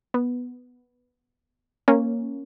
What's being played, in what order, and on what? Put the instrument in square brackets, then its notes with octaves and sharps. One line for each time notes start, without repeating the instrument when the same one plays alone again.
[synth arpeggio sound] B3
A#3 C#4